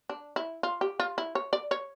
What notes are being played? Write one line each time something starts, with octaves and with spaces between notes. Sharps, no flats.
D4
E4
F4
G4
F4
E4
C#5
D5
C#5